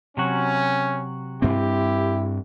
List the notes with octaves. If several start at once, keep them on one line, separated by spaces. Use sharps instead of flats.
C3 F#3 C#4 F#4
G2 C4 E4 G4